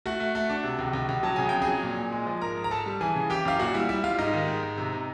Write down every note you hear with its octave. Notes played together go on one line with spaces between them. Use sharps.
A3 F#4 F#5
A3
A3
D4
C3
C#2
C#2
C#2
F#3 A5
C#3 G#5
F2 G5
G#4 G#5
F#3
A#2
A#2
G#3
F3
G#2 A#4 A#5
G#2
A#5
G#2 A4 A5
G3
E3 G#4 G#5
C#3
E3 G4 G5
F#2 F5
A#2 F#4 F#5
G3 E4 E5
G3 E4 E5
G3 F4 F5
G#2 D#4 D#5
D#3
G#2
G#2
C3
C3